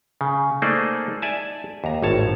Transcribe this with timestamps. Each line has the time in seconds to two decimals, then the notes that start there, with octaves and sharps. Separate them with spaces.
0.21 C#3
0.62 A3 A#3 D#4 G#4 C5 D5
1.22 D5 E5 G#5 A5
1.84 D#2 A#5
2.02 G#1 A2 C#5 A5